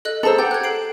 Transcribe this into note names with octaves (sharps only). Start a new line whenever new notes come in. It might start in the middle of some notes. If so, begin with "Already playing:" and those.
A4 D#5 F#6
G#4 A4 C5 A#5 E6
G4 F#5 G6
F#6 G#6
A4 C7 D7